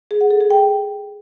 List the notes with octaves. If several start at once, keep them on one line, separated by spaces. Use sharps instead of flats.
G#4
F#5
A4
G#4
G5